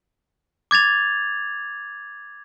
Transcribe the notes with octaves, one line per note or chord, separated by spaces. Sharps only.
D6 G#6 A6 F7